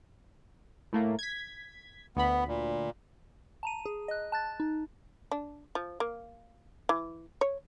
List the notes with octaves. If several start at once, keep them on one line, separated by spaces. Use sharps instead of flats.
A2 A3 A#3
G#6 B6
D2 B3 B5
A#2
A5 A#5 D#7
G#4
D#5 F#6
A5 F#6 A6
D#4
D4
F3
A#3
E3
C#5